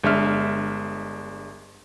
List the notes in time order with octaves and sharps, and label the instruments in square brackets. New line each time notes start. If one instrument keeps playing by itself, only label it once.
[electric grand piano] G1 G#3 D4 E5 F6